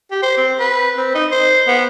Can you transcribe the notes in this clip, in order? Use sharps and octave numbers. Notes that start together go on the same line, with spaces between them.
G4
C5
C4
B4
C4
D#4
C5
B3